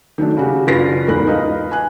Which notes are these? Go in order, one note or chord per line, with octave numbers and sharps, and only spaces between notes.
D#3 F#3 A3 D4
C#3 F#4 G4
F#1 D4 F4 B4 A#6 C7
E2 G#2 A#4 B5 F#6
D#4 B4 F5
G#5 F#6